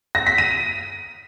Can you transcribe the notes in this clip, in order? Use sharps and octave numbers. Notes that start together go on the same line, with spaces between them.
A#6
B6
D#7